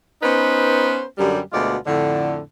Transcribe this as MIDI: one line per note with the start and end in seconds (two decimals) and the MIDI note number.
0.22 1.01 59
0.22 1.01 61
0.22 1.01 63
0.22 1.01 71
0.22 1.01 72
1.17 1.38 42
1.17 1.38 50
1.17 1.38 55
1.51 1.75 38
1.51 1.75 47
1.51 1.75 56
1.51 1.75 65
1.51 1.75 74
1.85 2.37 41
1.85 2.37 45
1.85 2.37 50